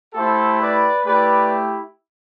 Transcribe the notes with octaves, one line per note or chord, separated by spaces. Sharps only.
A3 E4 G4 A4 C5
B4 D5
A3 E4 G4 B4 D5